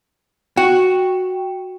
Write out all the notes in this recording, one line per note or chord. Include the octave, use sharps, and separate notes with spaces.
F#4 G5